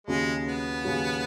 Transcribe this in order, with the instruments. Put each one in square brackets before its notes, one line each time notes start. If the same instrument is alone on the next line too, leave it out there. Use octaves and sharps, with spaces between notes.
[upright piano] D#2 C#3 F#3 C#4 [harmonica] G#3
[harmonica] B3
[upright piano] D#2 C#3 F#3 C#4